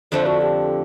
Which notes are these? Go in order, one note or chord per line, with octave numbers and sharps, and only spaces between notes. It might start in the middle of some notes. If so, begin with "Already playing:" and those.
F2 D3 F3 A3 C5
F#4
G4